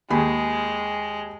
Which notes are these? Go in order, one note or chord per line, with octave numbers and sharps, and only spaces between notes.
D#2 G#3 G#4 B5